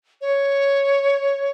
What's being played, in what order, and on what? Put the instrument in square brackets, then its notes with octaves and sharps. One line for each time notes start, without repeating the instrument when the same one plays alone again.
[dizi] C#5